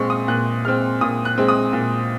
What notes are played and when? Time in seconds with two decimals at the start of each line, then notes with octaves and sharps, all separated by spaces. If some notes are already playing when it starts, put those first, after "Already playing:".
Already playing: A#2 G#3 C4 C6 C#6
0.10 D#6
0.28 A#2 F#6
0.65 G#3 C4 F6
1.01 A#2 D#6
1.25 F#6
1.38 G#3 C4
1.48 D#6
1.73 A#2